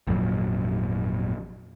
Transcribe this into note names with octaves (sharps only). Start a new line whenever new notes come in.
G#1 F2 A#2 F#3